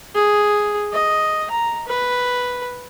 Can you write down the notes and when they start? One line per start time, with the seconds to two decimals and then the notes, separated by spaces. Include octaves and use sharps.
0.15 G#4
0.93 D#5
1.51 A#5
1.88 B4